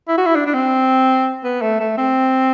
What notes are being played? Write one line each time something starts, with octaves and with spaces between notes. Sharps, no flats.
E4
F#4
E4
D4
D4
C4
B3
A3
A3
C4